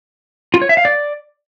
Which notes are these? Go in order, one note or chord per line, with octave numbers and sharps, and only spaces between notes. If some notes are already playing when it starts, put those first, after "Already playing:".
F4
C#5
E5
F5
D5